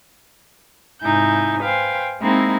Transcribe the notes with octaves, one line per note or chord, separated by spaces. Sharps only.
G#2 C3 D#4 E4 G#5 G6
B4 C5 F5 G5 G#5
G#3 A#3 C4 D#4 E4 G#4